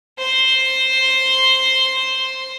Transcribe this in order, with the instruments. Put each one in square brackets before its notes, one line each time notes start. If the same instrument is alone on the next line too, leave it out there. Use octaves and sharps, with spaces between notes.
[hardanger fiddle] C5 C6